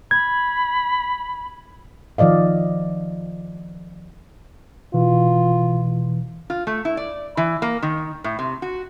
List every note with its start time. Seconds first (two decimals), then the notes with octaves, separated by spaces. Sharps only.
0.11 B5 G#6
2.18 D#3 F3 D5 D#5 F5
4.94 B2 E3 F4
6.50 F4
6.67 A3
6.85 E4
6.97 D5
7.37 E3
7.62 A#3
7.82 D#3
8.24 A2
8.39 C3
8.62 F#4